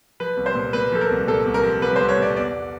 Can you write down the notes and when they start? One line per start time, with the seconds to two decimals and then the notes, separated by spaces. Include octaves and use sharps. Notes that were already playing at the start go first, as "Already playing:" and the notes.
0.20 F3 B4
0.37 C2
0.46 C5
0.55 A#2
0.73 A#2 B4
0.92 F3 A4
1.01 A#4
1.10 C2
1.27 A#2 A4
1.46 C2
1.54 A#4
1.63 F3
1.82 C2 B4
1.96 C2 C5
2.08 C#5
2.18 A#2 D5
2.35 E2 D5